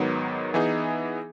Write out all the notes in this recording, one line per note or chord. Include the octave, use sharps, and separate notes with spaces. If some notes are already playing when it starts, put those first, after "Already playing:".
Already playing: G#2 D#3 F#3 B3
E3 B3 D#4 G#4